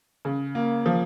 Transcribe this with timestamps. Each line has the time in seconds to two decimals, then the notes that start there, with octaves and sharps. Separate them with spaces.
0.25 C#3
0.55 A#3
0.86 F3